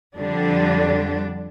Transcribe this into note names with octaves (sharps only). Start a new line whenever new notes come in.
F2 D3 G3 D4